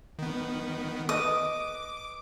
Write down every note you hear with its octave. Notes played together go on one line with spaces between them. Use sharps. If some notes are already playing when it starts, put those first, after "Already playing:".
D#3 B3
B4 D#5 D6 D#6